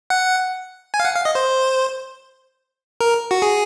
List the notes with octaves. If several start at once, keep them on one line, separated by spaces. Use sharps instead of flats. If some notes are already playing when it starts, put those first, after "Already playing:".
F#5
G#5
F5
F#5
F5
D#5
C5
A#4
F#4
G#4